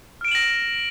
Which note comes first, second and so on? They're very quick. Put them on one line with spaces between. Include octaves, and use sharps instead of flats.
F6 D7 E7 F#7 A#6